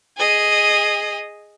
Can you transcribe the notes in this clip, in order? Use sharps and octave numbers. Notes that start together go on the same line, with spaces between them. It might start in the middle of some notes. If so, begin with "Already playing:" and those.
G#4 D#5